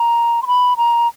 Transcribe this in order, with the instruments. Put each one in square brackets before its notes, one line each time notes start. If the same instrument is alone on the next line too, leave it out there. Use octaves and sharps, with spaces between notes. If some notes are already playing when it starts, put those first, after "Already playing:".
Already playing: [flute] A#5
C6
B5
A#5